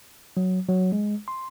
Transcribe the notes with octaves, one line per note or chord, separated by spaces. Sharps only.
F#3
F#3
G#3
C6